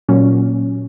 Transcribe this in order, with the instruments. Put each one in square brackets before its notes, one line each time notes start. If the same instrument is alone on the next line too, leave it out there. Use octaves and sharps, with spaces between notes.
[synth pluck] A#2 F#3 C#4